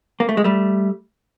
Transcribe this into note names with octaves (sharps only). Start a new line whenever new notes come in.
A#3
A3
G#3
G3 A3